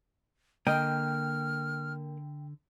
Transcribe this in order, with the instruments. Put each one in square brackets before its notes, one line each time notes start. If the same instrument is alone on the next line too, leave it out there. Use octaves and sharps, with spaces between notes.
[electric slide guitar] D3 [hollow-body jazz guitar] A#3 D#5 [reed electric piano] G5 [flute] F6